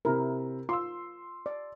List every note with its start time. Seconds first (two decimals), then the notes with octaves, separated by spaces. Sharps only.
0.05 C3 E4 A#4
0.69 F4 C6 E6
1.46 D5